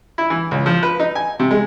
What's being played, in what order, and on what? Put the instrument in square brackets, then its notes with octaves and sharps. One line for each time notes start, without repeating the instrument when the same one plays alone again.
[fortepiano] E4
E3
C#2
F3
B4
D#4
G#5
C3
G#3